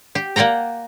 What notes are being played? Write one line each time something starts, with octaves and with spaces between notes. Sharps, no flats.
G4
A#3 D5 F#5 G5 A#5